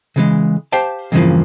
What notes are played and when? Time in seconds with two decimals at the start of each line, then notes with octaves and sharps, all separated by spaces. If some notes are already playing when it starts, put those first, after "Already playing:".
0.16 C#3 E3 G#3
0.72 G4 C5 F5 G5 A5
1.12 E2 G2 C#3 E3 F3 A#3